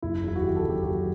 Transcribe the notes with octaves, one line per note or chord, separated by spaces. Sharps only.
F#1 E4
E2 E4
F#4
D#3 G4
A4
F#1
G4
F#1 F#4